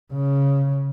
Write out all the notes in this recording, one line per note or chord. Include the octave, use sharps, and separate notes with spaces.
C#3